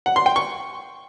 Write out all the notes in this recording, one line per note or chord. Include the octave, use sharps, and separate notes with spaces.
F#5
C6
G5
C#6